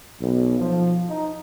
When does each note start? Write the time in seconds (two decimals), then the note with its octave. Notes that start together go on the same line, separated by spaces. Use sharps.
0.19 B1
0.59 F3
1.08 D#4